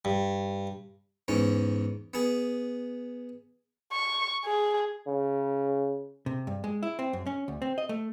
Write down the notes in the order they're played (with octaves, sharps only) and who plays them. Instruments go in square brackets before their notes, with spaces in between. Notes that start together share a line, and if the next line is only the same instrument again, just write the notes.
[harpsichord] G2
E2 G#2 C#4
B3 G#4
[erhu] C#6
G#4
[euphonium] C#3
[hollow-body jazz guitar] C3
G2
G#3
E4
C4
F#2
C#4
D2
C4
D#5
A3